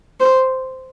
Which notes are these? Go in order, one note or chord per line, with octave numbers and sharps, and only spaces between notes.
C5